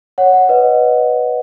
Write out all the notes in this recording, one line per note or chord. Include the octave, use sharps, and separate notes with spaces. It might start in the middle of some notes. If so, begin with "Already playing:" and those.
C#5 F#5
C#5 F#5
B4 D#5